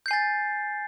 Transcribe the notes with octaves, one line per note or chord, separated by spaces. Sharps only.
G#5 G6 A6 C7